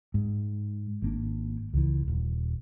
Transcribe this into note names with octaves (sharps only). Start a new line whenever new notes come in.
G#2
G#1 A#3 D4
C#2 E3
D#1